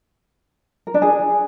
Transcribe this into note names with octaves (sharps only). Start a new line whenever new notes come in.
A#4
D4
G#4